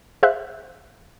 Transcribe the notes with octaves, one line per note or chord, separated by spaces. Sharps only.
G#4 C5 E5 F5 F#6